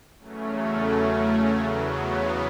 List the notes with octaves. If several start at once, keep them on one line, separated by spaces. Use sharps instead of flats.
E2 C#3 F#3 A3 C#4
E2 C#3 F#3 B3